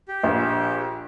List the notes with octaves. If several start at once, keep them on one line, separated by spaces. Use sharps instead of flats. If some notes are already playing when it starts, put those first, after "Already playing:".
G4
A#1